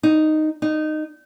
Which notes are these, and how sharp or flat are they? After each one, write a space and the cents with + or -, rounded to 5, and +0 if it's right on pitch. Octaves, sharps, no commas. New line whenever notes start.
D#4 -5
D#4 -15